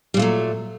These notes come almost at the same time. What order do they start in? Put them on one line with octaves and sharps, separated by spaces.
G3 A#2 A3 F#3